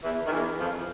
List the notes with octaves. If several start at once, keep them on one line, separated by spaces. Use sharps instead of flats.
E2 E3
D#3
E2 E3
F2 F3